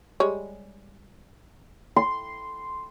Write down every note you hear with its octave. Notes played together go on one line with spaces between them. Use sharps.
G3 G#3 C#5
C6